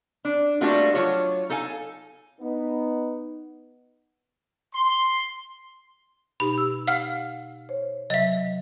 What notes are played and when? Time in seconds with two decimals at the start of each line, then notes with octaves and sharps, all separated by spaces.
0.25 D4
0.61 G3 A3 A#3 D4 F4 F#4
0.95 F#3 D4 F4 C#5
1.50 D#4 A4 F5 G#5
2.41 B3 D#4
4.75 C6
6.40 B2 D#4 G4 B5
6.58 E6
6.88 F5 F#5 F6
7.69 C5 C#5
8.10 C3 F#3 D#5 E5